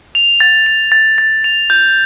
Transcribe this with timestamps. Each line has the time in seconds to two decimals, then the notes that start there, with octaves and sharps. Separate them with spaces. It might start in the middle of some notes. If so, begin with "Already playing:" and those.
0.15 F7
0.40 A6
0.66 F7
0.92 A6
1.18 A6
1.44 F7
1.70 G6